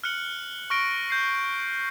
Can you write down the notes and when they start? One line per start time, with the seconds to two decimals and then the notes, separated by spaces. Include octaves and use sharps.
0.04 F6 F#6 C#7 F#7
0.70 C#6 F6 A#6 D7
1.10 G6 C7